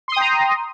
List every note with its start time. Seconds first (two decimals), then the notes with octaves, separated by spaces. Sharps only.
0.08 C6
0.12 D#6
0.16 G5
0.21 A#5